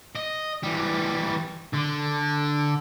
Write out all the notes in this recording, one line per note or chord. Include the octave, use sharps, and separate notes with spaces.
D#5
E3 G3
D3